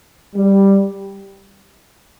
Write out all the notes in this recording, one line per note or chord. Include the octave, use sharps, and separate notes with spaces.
G3